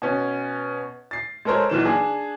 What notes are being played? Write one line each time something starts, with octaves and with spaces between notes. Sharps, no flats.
B2 B3 C#4
A6 C7
G#3 A4 A#4 C5 C#5
B1 A#2 E3 E7
D4 G#4